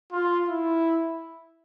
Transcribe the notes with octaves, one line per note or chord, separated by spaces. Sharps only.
F4
E4